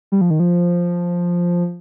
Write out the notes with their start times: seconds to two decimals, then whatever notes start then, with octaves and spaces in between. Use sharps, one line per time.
0.12 G3
0.21 F3
0.30 D#3
0.40 F3